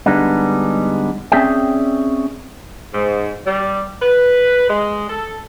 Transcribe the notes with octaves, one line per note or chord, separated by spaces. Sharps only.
D3 G3 G#3 B3 D4 D#4
C4 C#4 G#4 D5 E5 G5
G#2
G3
B4
G#3
A4